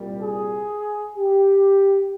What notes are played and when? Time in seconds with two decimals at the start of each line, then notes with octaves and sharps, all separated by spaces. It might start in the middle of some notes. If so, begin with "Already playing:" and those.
Already playing: C2 A#2 G3
0.20 G#4
1.15 G4